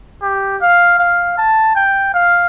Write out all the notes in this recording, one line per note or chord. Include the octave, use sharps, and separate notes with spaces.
G4
F5
F5
A5
G5
F5